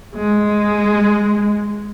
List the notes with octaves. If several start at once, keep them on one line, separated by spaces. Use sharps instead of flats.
G#3